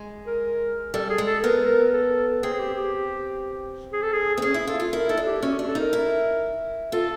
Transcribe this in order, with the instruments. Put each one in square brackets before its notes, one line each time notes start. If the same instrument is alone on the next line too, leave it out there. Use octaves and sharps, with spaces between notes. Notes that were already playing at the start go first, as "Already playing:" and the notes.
Already playing: [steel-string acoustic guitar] G#3
[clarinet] A#4
[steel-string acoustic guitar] G3 [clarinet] A4
[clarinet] G#4
[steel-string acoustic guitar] G#3
[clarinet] A4
[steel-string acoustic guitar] B3 [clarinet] A#4
[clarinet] A#4
A4
[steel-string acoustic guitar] C4 [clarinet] G#4
[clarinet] G#4
G4
G4
G#4
A4
G#4
[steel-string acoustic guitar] C4
[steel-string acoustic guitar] C#4 [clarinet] G#4
[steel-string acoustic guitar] E4
[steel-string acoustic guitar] F4 [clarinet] A4
[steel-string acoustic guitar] F4
[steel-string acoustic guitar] E4 [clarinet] A#4
[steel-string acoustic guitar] D#4 [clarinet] A4
[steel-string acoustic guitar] D4
[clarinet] G4
[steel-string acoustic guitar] C#4 [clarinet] F#4
[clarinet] F#4
[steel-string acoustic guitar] D4
[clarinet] A4
[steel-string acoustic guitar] D#4 [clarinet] A#4
[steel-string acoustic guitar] E4
[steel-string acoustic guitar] F4 [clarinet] A4